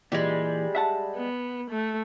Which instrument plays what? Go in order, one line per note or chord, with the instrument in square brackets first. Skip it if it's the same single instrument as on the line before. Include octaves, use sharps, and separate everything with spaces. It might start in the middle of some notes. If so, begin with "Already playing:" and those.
[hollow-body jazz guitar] A#2 E3 [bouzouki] G3 G#3
[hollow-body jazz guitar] E5 F#5 A5
[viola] B3
A3